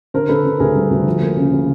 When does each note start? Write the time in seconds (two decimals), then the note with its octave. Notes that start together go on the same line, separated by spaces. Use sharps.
0.14 D3 A#4 C5
0.29 D3 A4 B4
0.45 D3
0.60 D2 G#4 A#4
0.76 G3
0.91 D2
1.06 F3
1.21 A#3
1.37 C#3
1.53 C#3